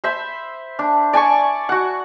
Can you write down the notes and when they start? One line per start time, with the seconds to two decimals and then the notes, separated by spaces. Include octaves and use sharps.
0.04 C5 E5 B5
0.79 D4
1.13 D5 G#5 A5 C#6
1.69 F#4 F#5